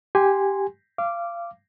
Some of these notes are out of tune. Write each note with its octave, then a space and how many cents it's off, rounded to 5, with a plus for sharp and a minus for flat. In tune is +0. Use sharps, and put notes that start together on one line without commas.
G4 +0 G#5 -15 C6 +0
F5 -25 D6 +0